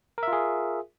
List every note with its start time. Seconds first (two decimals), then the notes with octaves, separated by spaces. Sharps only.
0.18 A#4
0.23 E5
0.28 F4
0.33 G#4